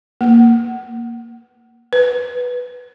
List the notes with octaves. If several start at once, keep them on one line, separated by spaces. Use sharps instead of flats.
A#3
B4